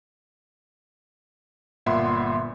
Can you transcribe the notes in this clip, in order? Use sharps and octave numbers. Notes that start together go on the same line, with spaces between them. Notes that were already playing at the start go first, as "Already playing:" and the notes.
G1 A#2 E5 F#5 B5 C6